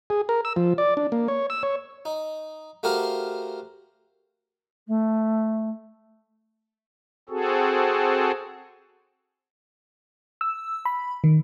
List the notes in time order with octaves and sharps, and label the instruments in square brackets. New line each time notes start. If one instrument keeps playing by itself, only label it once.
[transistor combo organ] G#4
A#4
E6
F3
D5
D4
A#3
C#5
E6
C#5
[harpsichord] D#4
A3 F#4 G4 A#4 C5 F5
[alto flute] A3
[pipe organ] C4 F#4 G#4 A4
[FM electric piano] E6
B5
D#3